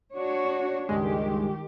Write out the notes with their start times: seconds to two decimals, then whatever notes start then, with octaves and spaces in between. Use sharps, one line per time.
0.14 D4 F#4 C#5
0.89 C#2 G2 D#3 G#3 G4